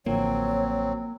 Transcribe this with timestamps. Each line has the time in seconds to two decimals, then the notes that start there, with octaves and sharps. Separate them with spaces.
0.06 A1 D3 F3 F#3 A#3 C4 C#5